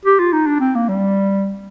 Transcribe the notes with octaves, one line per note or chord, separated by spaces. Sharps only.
G4
F4
D#4
D4
C4
A#3
G3